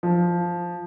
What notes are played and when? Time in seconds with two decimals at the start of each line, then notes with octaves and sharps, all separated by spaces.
0.03 F3